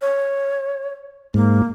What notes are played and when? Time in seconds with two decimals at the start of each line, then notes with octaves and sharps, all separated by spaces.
0.01 C#5
1.34 G#2 A#3